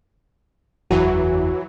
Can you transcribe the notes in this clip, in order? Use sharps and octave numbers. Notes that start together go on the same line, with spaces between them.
F#1 E2 E3 F#3 F#4